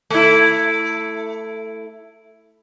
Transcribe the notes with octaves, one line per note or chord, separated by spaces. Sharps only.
A3 E4